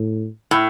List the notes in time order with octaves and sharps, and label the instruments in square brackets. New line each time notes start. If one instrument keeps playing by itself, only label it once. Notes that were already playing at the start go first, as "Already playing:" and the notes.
Already playing: [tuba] A2
[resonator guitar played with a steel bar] A2